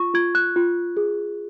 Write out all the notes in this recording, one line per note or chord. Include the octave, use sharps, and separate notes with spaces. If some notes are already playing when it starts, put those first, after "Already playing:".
Already playing: F4 C#6
F4 G#6
F#6
F4
G#4